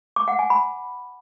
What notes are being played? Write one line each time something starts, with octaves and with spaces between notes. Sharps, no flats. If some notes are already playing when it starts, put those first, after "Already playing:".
D6
F#5
G#5
B5